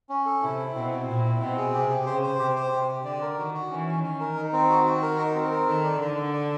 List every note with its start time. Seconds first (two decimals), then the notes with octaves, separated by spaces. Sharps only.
0.09 C#4
0.26 A4
0.42 C3 E4
0.59 E4
0.75 B2 C4
0.91 C4
1.08 A#2 E4
1.24 C4
1.41 B2 C4
1.57 G#4
1.74 C3 G4
1.90 G4
2.06 C#3 C5
2.23 C5
2.39 C3 G4
2.56 C5
2.72 C3 G4
2.88 G4
3.05 D3 D5
3.22 A#4
3.38 D#3 F#4
3.54 F#4
3.71 E3 C#4
3.87 C#4
4.03 D#3 C#4
4.20 A#4
4.37 D#4
4.53 C4
4.69 F#4
4.86 F#4
5.02 A#4
5.18 D#4
5.35 C4
5.51 A#4
5.68 D#3 A4
5.84 D5
6.01 D3 A4
6.17 A4
6.33 D5